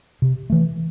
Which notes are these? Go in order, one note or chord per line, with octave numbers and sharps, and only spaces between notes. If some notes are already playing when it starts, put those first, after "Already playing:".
C3
E3 A3